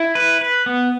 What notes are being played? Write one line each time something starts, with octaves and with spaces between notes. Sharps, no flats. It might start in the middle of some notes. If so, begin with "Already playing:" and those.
Already playing: E4
B4
B4
B3